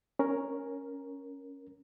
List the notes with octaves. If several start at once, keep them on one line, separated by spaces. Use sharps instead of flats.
C#4 A#4